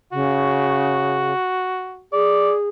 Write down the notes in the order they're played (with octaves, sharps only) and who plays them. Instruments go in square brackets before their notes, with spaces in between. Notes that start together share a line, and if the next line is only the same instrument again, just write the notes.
[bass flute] C#3 [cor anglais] F#4
[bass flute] G#4 [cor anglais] D5